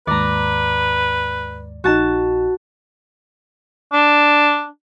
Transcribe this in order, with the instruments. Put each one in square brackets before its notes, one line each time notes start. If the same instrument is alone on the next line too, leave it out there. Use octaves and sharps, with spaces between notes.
[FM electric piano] D#2 G#2 [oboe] B4 [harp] D5 A#5
[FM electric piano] A#1 D#4 [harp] F#4 A5
[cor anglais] D4